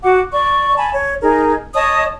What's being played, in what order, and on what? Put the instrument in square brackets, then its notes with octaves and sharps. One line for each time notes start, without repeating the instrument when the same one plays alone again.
[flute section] F#4 F#5 D6
D5 C#6
G#5 A5 B5
C#5
D#4 G#4 A#4
C#5 D#5 A5 D#6